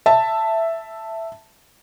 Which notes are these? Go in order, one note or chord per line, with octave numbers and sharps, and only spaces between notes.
E5 A5